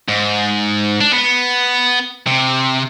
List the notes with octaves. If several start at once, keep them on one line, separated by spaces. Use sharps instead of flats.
G#2
D4
B3
C3